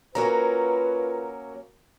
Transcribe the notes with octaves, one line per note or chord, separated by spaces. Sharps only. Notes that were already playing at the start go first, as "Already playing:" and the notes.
F#3 A#3 C#4 F4 F#4 A#4 B4 A#5